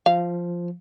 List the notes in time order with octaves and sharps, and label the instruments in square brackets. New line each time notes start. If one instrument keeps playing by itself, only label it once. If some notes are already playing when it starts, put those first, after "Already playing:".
[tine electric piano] F3 [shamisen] F5